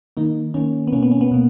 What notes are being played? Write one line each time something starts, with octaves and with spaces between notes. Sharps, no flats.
D#3 A#3 D#4
D#3 A#3 C#4
B3
B2 A#3 C#4
B3
C#4
B3
B2 A#3